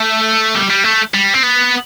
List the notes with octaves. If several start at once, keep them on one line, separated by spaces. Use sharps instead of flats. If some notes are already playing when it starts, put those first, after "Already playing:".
Already playing: A3
G3
G3
A3
G3
C4
B3